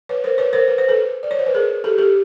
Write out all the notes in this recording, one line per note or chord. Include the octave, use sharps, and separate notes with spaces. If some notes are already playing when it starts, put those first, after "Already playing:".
B4 C#5
A#4 C5
B4 C#5
A#4 C5
B4
C5
A4 B4
D5
C#5
C5
B4
G#4 A#4
G4 A4
G4 A4